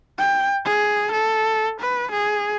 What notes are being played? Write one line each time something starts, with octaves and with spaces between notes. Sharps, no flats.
G5
G#4
A4
B4
G#4